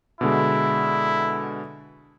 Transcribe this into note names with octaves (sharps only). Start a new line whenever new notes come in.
B2 D3 G#3 E4